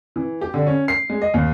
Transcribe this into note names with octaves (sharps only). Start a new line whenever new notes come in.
E3
G4
D3
C#4
C7
G#3
D#5
D#2